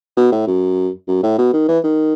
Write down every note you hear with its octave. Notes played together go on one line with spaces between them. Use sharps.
B2
A2
F#2
F#2
A2
B2
D#3
E3
D#3